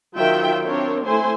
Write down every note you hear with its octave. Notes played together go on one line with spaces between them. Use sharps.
D#3 F#3 F4 C5 E5 G5
C4 D4 A#4 C5 C#5
A3 E4 C5 G#5 C6